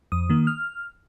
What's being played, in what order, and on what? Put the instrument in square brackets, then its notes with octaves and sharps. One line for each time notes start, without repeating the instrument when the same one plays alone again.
[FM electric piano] F2 D#6
D#3 A#3
F6